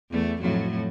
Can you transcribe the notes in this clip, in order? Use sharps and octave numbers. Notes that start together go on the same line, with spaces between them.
E2 A3
F2 A2 F#3